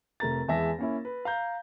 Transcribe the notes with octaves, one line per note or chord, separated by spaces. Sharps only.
F1 A3 A#4 A#5 A6
E2 E3 G#3 E5 A5 A#6
A#3 C#4 E4
B4
F5 A#5 G6